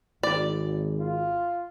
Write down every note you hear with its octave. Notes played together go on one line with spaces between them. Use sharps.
G#1 D5
F4